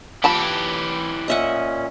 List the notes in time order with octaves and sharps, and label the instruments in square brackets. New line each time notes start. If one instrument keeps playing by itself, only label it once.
[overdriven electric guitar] E3 G4 [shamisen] F4 A5 B5
[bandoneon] A#2 C#4 [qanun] D#5 E5 F#5